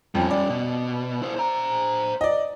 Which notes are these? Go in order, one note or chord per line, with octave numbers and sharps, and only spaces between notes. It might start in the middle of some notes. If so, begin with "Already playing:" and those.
F2 G3 C#4
D5
B2
E4 C5
C5 A#5
D5 D#5